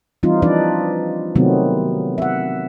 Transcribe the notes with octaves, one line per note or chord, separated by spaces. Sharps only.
E3 G3 C4 D#4 F4
E3 F3 D4 D#4 B4 D5
C3 D#3 F#3 A3 B3 C4
E5 F#5